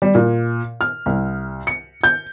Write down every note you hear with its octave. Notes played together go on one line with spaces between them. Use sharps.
G3
A#2
F6
C2
C#7
G6